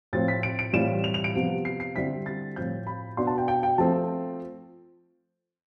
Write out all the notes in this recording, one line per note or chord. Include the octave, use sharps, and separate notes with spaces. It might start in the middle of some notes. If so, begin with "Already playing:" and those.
A2 F3 C4 A6
B6
D7
D7
A2 E3 G3 C4 F4 E7
F7
F7
D7
C3 F3 B3 F4
C7
C7
D3 G3 C4 E4 B6
A6
A2 F3 C4 G6
B5
B2 B3 D4 C6
A5
G5
G5
G5
F3 A3 C4 A5